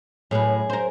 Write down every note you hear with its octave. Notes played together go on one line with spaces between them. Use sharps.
F#2 A2 G#4 B4
A#4 C5